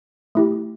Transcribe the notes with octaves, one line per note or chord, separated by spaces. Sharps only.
A3 E4 G4